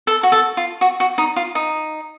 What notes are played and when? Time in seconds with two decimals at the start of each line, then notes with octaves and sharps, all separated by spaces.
0.07 A4
0.23 F#4
0.32 A4
0.57 F4
0.81 F#4
1.00 F#4
1.18 D#4
1.36 F4
1.55 D#4